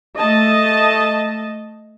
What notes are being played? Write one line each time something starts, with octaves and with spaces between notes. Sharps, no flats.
A3 D#5 A5